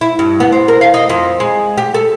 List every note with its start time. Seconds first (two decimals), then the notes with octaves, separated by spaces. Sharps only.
0.01 E4
0.19 G2
0.40 B3
0.52 C4
0.68 A#4
0.81 F5
0.94 D#4
1.10 F2
1.40 G#3
1.78 G4
1.94 A4